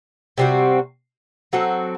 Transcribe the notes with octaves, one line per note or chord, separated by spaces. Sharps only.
C3 G3 C4 F#4
F#3 C4 F#4 A4